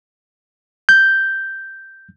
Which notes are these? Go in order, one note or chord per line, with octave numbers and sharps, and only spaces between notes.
G6